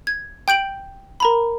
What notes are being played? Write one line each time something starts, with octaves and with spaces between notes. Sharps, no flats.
G#6
G5 G6 D7 F#7
A#4 A#5 B5